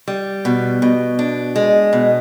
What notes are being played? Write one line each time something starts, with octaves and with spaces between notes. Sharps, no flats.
G3
B2
B2
D4
G#3
B2